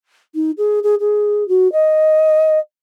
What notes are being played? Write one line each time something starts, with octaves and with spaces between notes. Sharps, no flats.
D#4
G#4
G#4
G#4
F#4
D#5